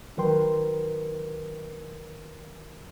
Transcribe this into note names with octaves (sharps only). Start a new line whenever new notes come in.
D#3 F#3 A#4 B4 G5 C6